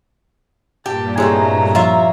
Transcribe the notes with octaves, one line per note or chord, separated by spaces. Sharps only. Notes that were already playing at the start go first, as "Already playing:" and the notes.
G2 A#2 G4 A5
G#3 A3 C4 E4 G4 C#5 A#5
F3 F4 C#5 E5